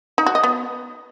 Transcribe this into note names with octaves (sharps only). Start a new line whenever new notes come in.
D#4
F#4
D#5
B3